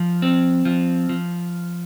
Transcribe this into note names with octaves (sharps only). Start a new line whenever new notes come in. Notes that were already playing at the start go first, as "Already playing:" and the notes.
Already playing: F3
C4
F3
F3